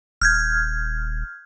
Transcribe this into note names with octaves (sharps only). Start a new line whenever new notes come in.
D#1 F6 G6 G#6